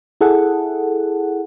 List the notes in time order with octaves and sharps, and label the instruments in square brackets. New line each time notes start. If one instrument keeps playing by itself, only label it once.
[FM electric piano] E4 G#4 A4 F#5